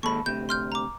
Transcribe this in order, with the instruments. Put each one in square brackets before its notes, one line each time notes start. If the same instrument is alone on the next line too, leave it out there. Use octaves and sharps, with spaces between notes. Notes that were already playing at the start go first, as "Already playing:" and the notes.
[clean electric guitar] D#2 G#2 A4 [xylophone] B5 C#6
[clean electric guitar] D2 C3 [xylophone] G6
[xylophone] C6 F6 G6
A#5 D6